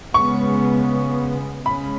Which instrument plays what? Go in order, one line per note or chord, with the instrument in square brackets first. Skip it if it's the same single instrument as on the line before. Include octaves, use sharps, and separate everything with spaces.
[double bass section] C#3 G#3 B3 [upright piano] C#6
[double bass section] C#3 G#3 C#4 [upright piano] B5